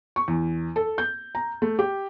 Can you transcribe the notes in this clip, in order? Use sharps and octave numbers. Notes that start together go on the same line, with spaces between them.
C#6
E2
A4
G6
A#5
A3
G4